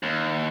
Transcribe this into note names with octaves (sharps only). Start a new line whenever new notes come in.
D#2